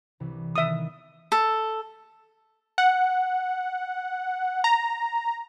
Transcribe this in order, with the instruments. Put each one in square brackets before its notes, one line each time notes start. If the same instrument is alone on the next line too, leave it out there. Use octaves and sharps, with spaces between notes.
[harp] C2 C3 E3
[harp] D#3 B3 [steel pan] E5 D#6
[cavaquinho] A4
[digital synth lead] F#5
A#5